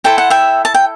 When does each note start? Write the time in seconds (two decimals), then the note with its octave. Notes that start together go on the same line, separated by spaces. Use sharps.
0.04 E4 A4 C5 G5
0.18 F#5
0.30 E5 G5
0.65 A5
0.74 G5